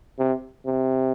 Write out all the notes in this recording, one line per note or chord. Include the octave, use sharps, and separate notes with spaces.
C3
C3